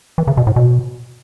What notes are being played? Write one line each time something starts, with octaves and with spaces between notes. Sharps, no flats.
E3
C#3
B2
A2
B2